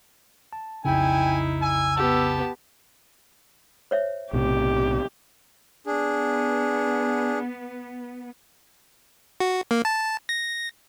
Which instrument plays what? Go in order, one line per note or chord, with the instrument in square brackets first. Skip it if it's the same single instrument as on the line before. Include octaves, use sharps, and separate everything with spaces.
[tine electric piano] A5
[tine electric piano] B1 F2 C#3 [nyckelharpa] D#4 E4 [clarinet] G5 [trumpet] G#5
[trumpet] G#5 [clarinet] E6
[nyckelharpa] B3 G4 [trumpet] A5
[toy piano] C5 C#5 E5
[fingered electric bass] B1 A2 C3 [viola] G4
[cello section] B3 [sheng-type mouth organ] D4 G#4
[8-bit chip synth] F#4
A#3
A5
A#6